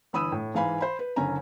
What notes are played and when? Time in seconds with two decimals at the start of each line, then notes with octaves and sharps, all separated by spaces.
0.13 G1 E3 B5 D#6 E6 D#7
0.32 A2
0.54 G#2 E3 F5 G#5 B5
0.81 C5 B5
0.99 B4
1.16 F#1 D3 C#4 G#5 A#5